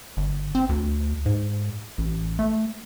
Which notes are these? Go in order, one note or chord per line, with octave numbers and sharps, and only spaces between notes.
G1
C4
D2
G#2
A1
A3